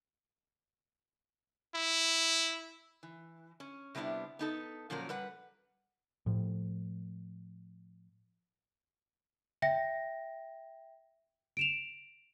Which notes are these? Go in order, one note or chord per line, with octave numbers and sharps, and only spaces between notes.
E4
E3
C#4
C3 G3 B3 D4 E4
B3 D#4 A4
A#2 F3 F#3 C#4 A#4
G3 B4 F#5
A2 F3
E5 G5 A#6
D7 E7 F7